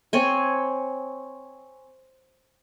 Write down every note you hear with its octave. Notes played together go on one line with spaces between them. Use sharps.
C4 C#5 G#5